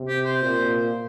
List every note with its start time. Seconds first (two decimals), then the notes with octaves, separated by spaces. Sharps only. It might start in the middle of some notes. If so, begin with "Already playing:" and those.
Already playing: C3
0.08 G4
0.25 C5
0.42 A#2